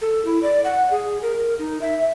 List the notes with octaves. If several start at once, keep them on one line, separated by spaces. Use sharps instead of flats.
A4
E4
D5
F#5
G#4
A#4
D#4
E5